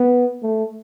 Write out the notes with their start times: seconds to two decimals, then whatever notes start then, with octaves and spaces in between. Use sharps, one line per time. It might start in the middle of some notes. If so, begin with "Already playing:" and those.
Already playing: B3
0.43 A3